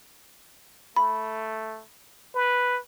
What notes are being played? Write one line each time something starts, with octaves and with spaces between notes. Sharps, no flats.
A3 B5
B4